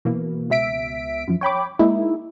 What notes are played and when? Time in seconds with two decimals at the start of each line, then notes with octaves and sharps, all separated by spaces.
0.05 B2 E3 A#3
0.50 C#2 B2 E5 B6 D7
1.27 F#2 F3
1.41 C#5 G5 B5 D6
1.79 G#3 A#3 D#4 E4